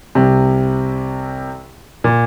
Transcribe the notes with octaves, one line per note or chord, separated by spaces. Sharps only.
C2 C3
A#2